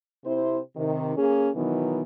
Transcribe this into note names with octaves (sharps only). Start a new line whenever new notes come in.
C3 C4 E4 C5
C3 D#3
A#3 C#4 G#4
B2 D#3 E3 F#3 B3